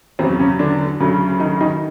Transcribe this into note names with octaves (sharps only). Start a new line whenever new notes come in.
E2 C#3 F#3 C4
C#3 C#4
D3 D4
D2 C#3 F#3
D#3 D#4
D#3 D#4